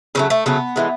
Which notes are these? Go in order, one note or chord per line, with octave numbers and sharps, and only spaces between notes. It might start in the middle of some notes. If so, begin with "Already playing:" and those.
C#3 F#3 A3 C#4
A3
C#3 F#3 A3 B3
A2 E3 G#3